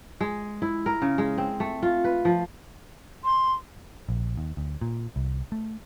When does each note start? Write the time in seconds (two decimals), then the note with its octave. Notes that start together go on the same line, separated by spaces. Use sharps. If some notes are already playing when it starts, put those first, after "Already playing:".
0.21 G#3
0.62 E4
0.86 A#4
1.02 C#3
1.18 G#3
1.38 C4
1.60 A3
1.83 F4
2.04 B4
2.25 F3
3.24 C6
4.09 A#1
4.37 D#2
4.57 D2
4.81 A#2
5.16 C2
5.52 A3